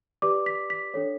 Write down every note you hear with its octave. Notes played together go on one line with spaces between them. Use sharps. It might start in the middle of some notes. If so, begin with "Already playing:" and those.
G4 B4 D5 D6
B6
B6
D4 A4 C#5